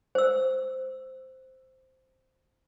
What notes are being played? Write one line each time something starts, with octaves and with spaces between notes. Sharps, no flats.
C5 E6